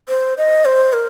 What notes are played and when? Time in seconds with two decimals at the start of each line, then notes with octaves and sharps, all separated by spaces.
0.09 C5
0.38 D#5
0.65 C5
0.93 A#4